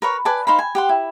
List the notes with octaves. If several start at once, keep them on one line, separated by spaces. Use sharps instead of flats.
A#4 B4 C#5
B4 D5 G#5 A5
D#4 C5 F5 B5
G#5
G4 F#5 C6
E4